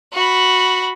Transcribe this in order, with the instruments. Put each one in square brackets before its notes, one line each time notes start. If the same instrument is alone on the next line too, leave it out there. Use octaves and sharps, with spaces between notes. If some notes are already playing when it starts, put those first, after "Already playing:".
[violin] F#4 B5